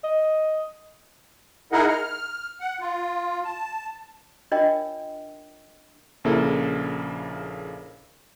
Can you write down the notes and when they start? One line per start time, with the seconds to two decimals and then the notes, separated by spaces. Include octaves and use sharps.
0.04 D#5
1.72 D#4 E4 G#4 A#4 D#5 F#5
1.89 F6
2.60 F#5
2.81 F4
3.44 A5
4.52 D4 F4 A#4 C#5 D#5 G5
6.24 A#1 C#3 A#3 E4 A4